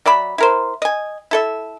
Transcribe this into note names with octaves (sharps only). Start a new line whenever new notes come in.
F#3 D5 E5 B5
E4 A#4 C5
D#5 G#5
E4 A4 E5